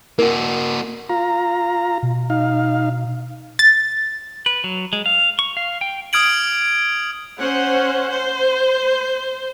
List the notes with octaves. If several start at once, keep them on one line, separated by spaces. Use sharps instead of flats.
A#3 F#4 A#4
F4 A#5
B2
D#4 F5
A6
B4
F#3
G#3
F5
C#6
F5
G5
D#6 F6 G#6 D7 F#7
C#4 C5 F#5
C5